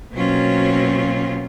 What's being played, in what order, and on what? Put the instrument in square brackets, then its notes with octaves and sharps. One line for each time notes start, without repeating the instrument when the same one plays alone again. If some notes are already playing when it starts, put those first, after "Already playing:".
[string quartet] B2 F#3 A#3 C4 C#4 F4